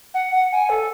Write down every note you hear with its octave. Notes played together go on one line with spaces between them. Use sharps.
F#5
F#5
G#5
A4